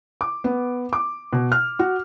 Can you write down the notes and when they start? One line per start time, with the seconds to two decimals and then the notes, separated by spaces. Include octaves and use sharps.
0.21 D6
0.44 B3
0.93 D6
1.33 B2
1.52 F6
1.79 F#4